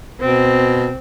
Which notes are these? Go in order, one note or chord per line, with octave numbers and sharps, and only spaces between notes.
B2 C4